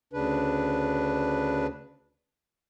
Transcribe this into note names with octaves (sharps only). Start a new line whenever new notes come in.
D2 C#3 D4 B4